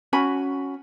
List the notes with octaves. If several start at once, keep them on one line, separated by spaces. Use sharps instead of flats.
C#4 F#4 G#5 B5